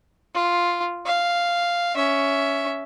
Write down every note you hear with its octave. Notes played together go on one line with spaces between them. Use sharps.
F4
F5
C#4 E5